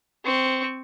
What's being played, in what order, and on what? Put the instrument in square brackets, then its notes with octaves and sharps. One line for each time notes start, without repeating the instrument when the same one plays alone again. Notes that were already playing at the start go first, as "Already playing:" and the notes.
[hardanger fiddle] C4 C#6